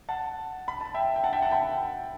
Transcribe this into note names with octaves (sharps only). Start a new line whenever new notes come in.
F#5 A5
B5
A5
E5 G5
G5
F#5 A5
E5 G5
F#5 A5
G5 B5